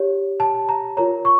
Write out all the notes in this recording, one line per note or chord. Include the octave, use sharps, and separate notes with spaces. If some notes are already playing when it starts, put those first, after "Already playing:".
Already playing: G4 C#5
A5
A#5
F4 A#4 C#5 A#5
C#6